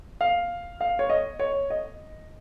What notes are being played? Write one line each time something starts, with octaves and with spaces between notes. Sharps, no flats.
F5
F5
C#5
D#5
C#5
D#5